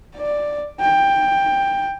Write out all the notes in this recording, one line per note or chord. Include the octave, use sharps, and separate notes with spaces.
D5
G5